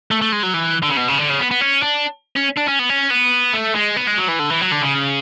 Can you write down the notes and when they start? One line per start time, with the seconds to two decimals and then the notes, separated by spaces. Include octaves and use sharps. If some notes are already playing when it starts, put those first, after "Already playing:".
0.11 A3
0.22 A3
0.32 G#3
0.43 F#3
0.54 E3
0.82 D3
0.90 C#3
0.97 B2
1.08 C#3
1.18 D3
1.29 C#3
1.39 B3
1.51 B3
1.61 C#4
1.83 D4
2.36 C#4
2.57 D4
2.68 C#4
2.79 B3
2.90 C#4
3.11 B3
3.54 A3
3.75 G#3
3.97 B3
4.07 G#3
4.18 F#3
4.28 E3
4.39 D3
4.50 E3
4.61 F#3
4.71 D3
4.82 C#3